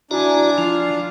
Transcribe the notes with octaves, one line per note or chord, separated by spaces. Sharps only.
D4 E4 F#4 D5 G#5 A#5
F3 F4